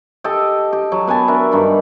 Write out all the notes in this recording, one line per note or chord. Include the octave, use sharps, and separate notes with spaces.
G4 A4 D#5 A5
G4
F#3
B3 B4 G#5 A5
D4 A#4 E5
G2 D#3 B5